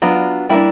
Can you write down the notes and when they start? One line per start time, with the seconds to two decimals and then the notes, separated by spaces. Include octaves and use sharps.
0.02 F#3 B3 D4 F4
0.49 G3 A#3 D4 E4